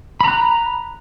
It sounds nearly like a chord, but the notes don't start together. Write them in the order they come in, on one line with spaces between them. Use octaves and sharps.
B5 A#5 F#6